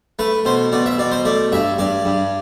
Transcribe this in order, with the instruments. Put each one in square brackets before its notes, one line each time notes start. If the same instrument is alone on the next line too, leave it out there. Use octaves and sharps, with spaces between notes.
[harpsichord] A3 B4
B2 C5
B2 D5
E5
B2 D5
C5
A3 D5
G2 E5
G2 D5
G2